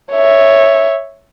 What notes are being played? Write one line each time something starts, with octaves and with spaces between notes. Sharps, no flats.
C#5 E5